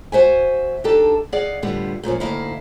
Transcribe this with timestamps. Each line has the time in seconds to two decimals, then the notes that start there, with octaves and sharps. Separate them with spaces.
0.12 F#4 C5 E5 G#5
0.84 D4 D#4 G4 A4 A5
1.32 G#4 D5 D#5 F5 F#5
1.62 A2 D3 G3 B3 F4
2.03 F#2 A#2 F3 C#4
2.20 D2 F#3 A#3 D#4 E4 F5